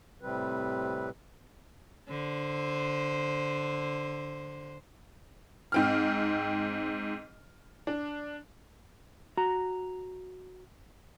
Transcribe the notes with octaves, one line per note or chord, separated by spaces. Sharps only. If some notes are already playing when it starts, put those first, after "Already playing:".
A2 C3 G3 C4 B4
D3 C5
G#2 C4 F6
D4
F#4 A#5